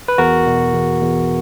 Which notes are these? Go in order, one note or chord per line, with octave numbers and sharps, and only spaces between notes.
B4
E2 F#4 A#4
B2
E2
E2